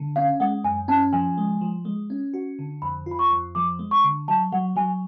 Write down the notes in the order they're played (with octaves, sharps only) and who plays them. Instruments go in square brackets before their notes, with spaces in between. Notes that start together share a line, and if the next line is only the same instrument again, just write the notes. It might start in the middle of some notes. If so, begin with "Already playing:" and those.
Already playing: [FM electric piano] D3
[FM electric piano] C#4 [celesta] F5
[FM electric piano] G#3 [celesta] F#5
[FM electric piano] F#2 [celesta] G#5
[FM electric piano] C#4 [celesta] A5
[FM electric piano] F3 [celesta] G#5
[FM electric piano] G#3
F3
G#3
C#4
F#4
D3
[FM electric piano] F2 [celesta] B5
[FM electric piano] F4
[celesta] B5
C#6
[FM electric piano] F2
[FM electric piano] F3 [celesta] D6
[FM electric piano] G#3
[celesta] C#6
[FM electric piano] D3
[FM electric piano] F#3 [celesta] A5
[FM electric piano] F#3 [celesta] F#5
[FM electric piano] F#3 [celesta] G#5